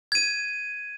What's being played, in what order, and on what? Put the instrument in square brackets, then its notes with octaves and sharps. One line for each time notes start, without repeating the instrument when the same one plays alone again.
[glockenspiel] G#6 D#7